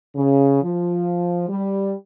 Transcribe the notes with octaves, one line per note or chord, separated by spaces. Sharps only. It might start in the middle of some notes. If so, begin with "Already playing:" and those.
C#3
F3
G3